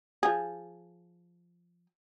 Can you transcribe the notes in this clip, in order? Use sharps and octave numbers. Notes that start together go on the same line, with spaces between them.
F3 G#4